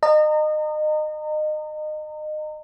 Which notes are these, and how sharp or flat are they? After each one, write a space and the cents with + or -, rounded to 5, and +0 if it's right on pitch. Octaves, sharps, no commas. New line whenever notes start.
D#5 -25 A#5 -35